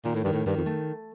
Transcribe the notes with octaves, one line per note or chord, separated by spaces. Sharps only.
A#2 D#3
A2
G2 D#3
A2
G2 D#3
F2
A3